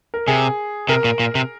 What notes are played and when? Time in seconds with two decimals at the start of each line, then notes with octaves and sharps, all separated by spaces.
0.14 A#4
0.27 C3 G#4
0.89 C3 A#4
1.04 A#2
1.20 A#2
1.35 C3